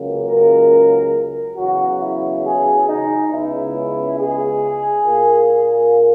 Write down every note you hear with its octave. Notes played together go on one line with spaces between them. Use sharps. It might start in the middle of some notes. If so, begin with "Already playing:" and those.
Already playing: C#2 C#3 F#3 A#3
A#4
E2 C#3 F#3 F#4
E4
G#4
D#4
C#2 C#3 G#3 B3 E4
G#4
A#2 A#3